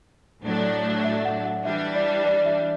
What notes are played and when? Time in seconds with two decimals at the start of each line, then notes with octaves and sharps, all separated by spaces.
0.44 A2 F#3 A3 D4
1.05 E5
1.25 F#5
1.45 F#5
1.65 E3 G3 D4 E5
1.95 D5
2.26 D5
2.46 E5